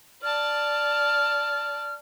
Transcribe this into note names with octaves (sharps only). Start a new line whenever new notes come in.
D5 A5 F6